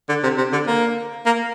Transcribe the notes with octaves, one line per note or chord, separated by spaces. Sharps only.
D3
C3
C3
D3
A#3
A#3